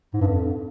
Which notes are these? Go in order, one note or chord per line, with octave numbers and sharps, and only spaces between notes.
G#2
G2
F2